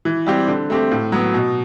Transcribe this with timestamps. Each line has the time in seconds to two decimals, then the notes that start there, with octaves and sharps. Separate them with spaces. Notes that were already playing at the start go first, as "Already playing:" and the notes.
0.05 E3
0.26 G3 C4 G4
0.48 D3
0.70 A3 C4 G4
0.91 A2
1.12 F#3 B3
1.34 B2